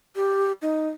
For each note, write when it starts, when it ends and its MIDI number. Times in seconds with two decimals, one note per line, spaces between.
0.16 0.52 67
0.62 0.89 63